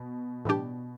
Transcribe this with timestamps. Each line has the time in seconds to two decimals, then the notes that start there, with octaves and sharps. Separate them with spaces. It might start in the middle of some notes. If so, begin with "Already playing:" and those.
Already playing: B2
0.45 A2 E3 G3 D4 G4